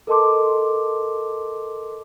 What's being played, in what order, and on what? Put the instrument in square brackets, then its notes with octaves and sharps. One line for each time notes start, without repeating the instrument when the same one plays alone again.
[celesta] A4 A#4 D#5 A5 C6 D6